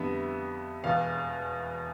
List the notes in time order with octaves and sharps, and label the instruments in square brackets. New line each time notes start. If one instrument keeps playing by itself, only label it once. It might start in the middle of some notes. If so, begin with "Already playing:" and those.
Already playing: [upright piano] F2 D3 G3 B3 E5
E1 E2 B2 F5